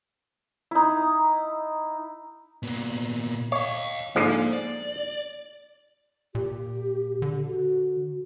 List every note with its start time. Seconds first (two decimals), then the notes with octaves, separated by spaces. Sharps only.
0.71 D#4 E4
2.63 A#2 B3
3.52 C#5 D#5 F5
4.16 G#2 D3 F3 A#3
4.53 D5
6.35 A#2 G4
7.22 D3
7.47 F#4